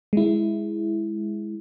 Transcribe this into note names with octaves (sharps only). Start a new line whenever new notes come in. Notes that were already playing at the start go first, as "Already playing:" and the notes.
G#3 E4